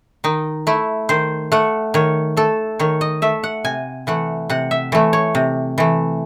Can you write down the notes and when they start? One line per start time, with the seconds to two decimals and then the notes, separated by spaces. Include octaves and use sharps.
0.24 D#3 D#4
0.67 A3 E4
1.09 D#3 C5
1.52 A3 F#5
1.94 D#3 C#5
2.37 A3 A4
2.79 D#3 C#5
3.01 D#5
3.22 A3 E5
3.44 F#5
3.64 C3 G#5
4.07 E3 A3 F#5
4.49 C3 F#5
4.71 E5
4.92 E3 A3 C#5
5.13 C#5
5.35 C3
5.78 E3 A3